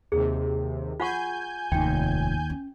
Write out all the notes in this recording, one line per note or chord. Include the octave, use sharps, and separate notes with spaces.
D#2 C3 G#4
F4 F#5 G#5 C#6 G6
F1 D#2 G#2 D#3 G5
C#4